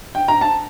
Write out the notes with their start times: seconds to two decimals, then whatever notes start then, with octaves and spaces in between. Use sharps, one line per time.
0.15 G5
0.28 A#5
0.41 A5